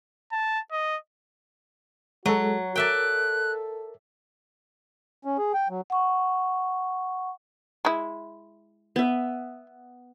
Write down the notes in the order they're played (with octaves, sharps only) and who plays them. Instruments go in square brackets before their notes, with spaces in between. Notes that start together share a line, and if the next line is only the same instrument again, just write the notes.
[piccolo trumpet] A5
D#5
[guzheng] F#3 [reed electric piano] G#3 A4 [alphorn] F#4
[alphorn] A4 [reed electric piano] A#4 [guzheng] D5 E5 G5 [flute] F#6
[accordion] C#4
G#4
G5
F#3
[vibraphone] F#5 C#6
[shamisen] G#3 E4
[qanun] B3 E5